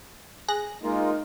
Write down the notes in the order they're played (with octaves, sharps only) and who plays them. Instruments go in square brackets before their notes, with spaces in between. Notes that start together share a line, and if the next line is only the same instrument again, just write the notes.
[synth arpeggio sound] G#4 F#6 A#6
[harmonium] G#3 A#3 F4 [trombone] D#4 [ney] A#4